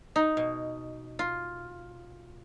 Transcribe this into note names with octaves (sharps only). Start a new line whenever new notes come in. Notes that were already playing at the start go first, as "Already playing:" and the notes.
D#4
B2
F4